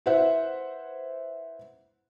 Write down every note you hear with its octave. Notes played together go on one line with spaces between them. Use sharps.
E4 B4 C5 E5 F#5